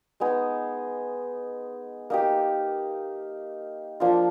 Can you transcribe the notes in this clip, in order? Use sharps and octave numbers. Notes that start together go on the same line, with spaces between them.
G#3 B3 D#4 G#4
A#3 D#4 G4
F3 A#3 D4 F4